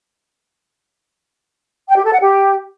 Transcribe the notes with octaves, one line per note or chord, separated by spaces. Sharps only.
G5
G4
A4
F#5
G4